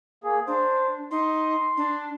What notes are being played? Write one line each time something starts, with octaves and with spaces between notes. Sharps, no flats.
A#3 G#4
D4 C5
D#4 C6
D4